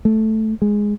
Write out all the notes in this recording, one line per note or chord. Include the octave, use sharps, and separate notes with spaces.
A3
G#3